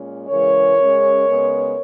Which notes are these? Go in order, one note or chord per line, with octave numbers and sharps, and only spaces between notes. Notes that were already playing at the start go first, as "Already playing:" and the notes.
Already playing: A#2 G#3 C#4
C#3 E3 G#3 A#4 C#5
C#3 G#3 C#4
C#3 G#3 B3